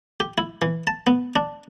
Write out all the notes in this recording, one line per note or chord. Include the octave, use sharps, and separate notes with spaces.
G4
E4
E3
A5
B3
D4